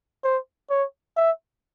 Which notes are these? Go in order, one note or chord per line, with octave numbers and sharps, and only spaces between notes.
C5
C#5
E5